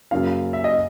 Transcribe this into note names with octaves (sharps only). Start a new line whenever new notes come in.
F#2 C#3 F#3 A#3 C#4 F5
E5
D#5